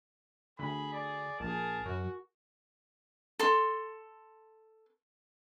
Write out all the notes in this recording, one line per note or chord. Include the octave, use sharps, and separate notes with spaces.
D2 G#4 B5
D5
A#1 G#4 A#4 A5
F#2 F#4
A4 C6